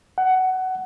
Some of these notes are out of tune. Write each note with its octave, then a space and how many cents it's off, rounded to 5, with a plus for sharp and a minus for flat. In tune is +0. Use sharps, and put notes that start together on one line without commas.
F#5 +15